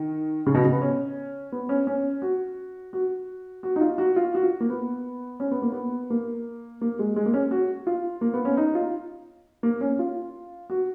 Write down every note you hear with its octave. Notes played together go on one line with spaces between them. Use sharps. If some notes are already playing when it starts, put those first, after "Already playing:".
Already playing: D#3
C#3
B2
C#3
B3
C#4
B3
C#4
C#4
F#4
F#4
F#4
D#4
F4
F#4
F4
F#4
F4
A#3
B3
C#4
B3
A#3
B3
A#3
A#3
G#3
G#3
A#3
C#4
F#4
F4
A#3
B3
C#4
D#4
F4
A#3
C#4
F4
F#4